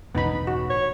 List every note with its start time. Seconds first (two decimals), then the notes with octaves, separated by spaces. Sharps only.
0.15 E1 A1 B3 D#4 B5
0.47 F#4
0.70 C#5